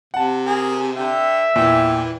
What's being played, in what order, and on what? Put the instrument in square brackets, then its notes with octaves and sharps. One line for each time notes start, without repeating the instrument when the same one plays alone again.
[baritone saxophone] C3 [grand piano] F#5 A5
[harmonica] G#4 A#4
[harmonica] D3 G5 [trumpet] E5
[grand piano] E2 A#2 [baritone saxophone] E3 [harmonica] G5